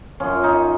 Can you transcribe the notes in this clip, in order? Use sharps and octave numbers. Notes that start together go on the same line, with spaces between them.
F#2 F3 C#4
D#4